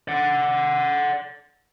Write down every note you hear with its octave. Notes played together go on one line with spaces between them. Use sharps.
D5 F#5